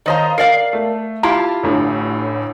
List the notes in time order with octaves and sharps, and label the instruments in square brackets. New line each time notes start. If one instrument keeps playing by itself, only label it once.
[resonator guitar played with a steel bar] D#3 C5 A#5 [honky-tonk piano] C#5 D#5 F5
[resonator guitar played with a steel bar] A#4 D5 F5 [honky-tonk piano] C7
[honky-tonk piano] A3
[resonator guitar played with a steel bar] E4 F4 G4 [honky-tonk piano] A5
[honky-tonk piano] A1 A2 D3